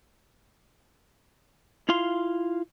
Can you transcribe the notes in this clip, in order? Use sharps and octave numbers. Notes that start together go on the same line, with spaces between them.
E4 F4 F5 C6